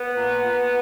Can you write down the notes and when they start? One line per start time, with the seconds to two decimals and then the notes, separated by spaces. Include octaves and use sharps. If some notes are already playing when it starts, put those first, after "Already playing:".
Already playing: B3
0.15 A#2
0.43 A#2